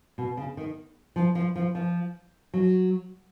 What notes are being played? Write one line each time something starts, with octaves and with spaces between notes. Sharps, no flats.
B2
C#3
D#3
F3
F3
F3
F3
F#3